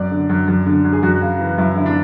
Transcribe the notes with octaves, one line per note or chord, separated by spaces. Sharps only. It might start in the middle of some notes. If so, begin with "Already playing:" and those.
Already playing: F#2 D5
D3
F#2
F#2
D3
F#2
G#4
F#2 F#4
C#3
E3
F#2 E4
D3 E4
D4